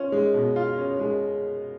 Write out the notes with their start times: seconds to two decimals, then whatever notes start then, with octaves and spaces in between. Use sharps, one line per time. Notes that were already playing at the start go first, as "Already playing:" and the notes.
Already playing: C#4 F4
0.12 G#3
0.34 B2
0.56 F4
0.78 C#4
0.99 G#3